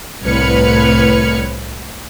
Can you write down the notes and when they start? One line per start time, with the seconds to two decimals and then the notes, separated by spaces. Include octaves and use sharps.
0.24 C2 A2 B4 F6 G#6 C#7